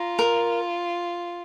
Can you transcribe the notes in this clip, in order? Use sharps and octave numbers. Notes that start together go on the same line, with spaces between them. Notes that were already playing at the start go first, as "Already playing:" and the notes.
Already playing: F4 A#5
A#4